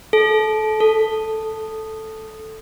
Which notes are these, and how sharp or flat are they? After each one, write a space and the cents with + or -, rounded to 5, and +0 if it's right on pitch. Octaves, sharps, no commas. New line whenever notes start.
A4 -25
A4 +0